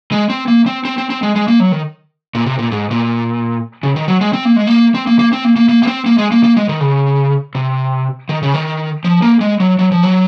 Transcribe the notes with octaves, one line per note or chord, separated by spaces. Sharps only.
G#3
C4
A#3
C4
C4
C4
C4
G#3
G#3
A#3
F#3
D#3
A#2
C3
A#2
G#2
A#2
C#3
D#3
F#3
G#3
C4
A#3
G#3
A#3
C4
A#3
A#3
C4
A#3
A#3
A#3
A#3
C4
A#3
G#3
A#3
A#3
G#3
D#3
C#3
C3
D#3
C#3
D#3
F3
A#3
G#3
F#3
F#3
F3
F#3